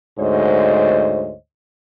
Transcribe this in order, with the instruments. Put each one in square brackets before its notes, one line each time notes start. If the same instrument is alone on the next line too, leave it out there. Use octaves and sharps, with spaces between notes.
[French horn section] D2 G#2 C5 C#5 D#5